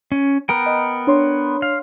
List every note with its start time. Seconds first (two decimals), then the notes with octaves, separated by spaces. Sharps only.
0.12 C#4
0.49 B3 A#4 G5
0.66 D#5
1.07 D4 C#5 C6
1.62 F5